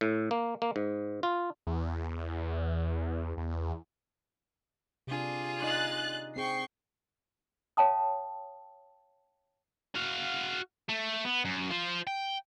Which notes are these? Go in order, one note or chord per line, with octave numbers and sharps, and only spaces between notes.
A2
A#3
A#3
G#2
F4
E2
E2
C3 D4 F4 G#4
D#4 D5 D#5 F#6 A6
C4 G#4 G5 C#6 C7
C#5 F5 G5 A5 D#6
F#4 F5
A3
B3
F#2
F4 C5
G5